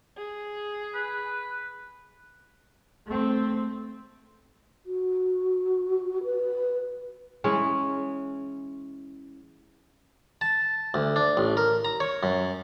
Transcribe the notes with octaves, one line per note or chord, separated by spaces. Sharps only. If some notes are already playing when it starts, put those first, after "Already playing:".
G#4
B4
A3 C4
F#4
B4
E3 G#3 C#4
A5
D2
D4
A1
A#4
A#5
C#5
F#2